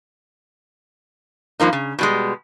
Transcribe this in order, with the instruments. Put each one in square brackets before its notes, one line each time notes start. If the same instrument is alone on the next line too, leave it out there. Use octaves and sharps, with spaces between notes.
[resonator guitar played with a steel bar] G2 F3 A#3 D#4
C#3
B2 G3 G#3